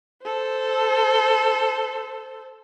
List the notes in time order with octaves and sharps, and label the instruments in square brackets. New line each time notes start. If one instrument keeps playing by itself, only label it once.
[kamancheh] A4 C5